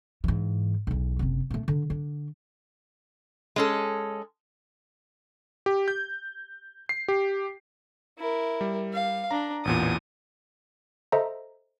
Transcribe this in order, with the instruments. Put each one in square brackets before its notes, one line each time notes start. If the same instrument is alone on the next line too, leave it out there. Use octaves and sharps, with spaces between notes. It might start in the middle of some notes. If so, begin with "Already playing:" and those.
[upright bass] G#2 E3
B1 E2
F#1 C3
A#2 A3
D3
D3
[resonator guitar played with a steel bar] G#3 C#4 A4
[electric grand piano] G4
G6
C7
G4
[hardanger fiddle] E4 A#4
[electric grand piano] G3
[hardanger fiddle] F5
[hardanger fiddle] D4 [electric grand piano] A#5
[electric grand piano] A1 E2 A#2 [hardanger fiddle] D#6
[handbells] A4 C5 D#5 E5 A#5